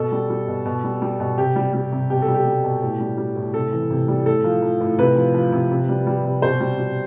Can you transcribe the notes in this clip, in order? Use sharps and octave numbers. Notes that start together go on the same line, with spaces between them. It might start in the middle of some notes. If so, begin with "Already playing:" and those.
Already playing: B2 A4
G3
G3
B2
B2
G3
G3
B2
C3 G4
G3
G3
C3
B2 G4
A4
G3
G4
G3
B2
A2
G3
G3
A2
C3 A4
E3
C3
G3
A2 A4
F3
F3
A2
C3 B4
F3
F3
C3
C3
G3
G3
C3
B2 C5
G3
G3